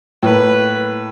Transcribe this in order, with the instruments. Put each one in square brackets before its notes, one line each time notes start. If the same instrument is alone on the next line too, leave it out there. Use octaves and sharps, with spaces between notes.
[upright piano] A2 A#3 [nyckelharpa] B4